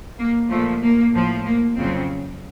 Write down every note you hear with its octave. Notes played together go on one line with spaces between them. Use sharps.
A#3
A#2 F3 A3
A#3
A2 F3
A#3
F2 C#3 F#3 C4